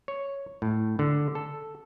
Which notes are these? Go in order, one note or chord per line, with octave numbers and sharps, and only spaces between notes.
C#5
A2
D3
A4